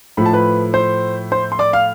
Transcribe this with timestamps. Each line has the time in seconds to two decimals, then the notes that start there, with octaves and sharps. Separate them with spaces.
0.17 A2 F3 A3 B5
0.26 A5
0.33 B4 B5
0.74 C5 C6
1.32 C5 C6
1.52 C6
1.59 D5 D6
1.73 F5 F6